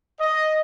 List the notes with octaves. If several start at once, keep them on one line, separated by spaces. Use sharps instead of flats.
D#5